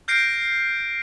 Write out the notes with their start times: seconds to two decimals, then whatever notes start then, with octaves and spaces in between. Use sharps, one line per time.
0.08 F6 G6 A#6 C7 D7